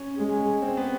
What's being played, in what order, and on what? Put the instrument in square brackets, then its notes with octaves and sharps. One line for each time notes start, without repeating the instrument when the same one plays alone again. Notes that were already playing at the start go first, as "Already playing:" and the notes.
Already playing: [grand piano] C#4
[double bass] G#3
[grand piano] C4
B3